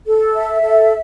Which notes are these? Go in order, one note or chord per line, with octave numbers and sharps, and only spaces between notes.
A4
E5
A4